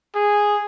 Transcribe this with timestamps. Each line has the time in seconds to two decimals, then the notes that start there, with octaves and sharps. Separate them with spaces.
0.15 G#4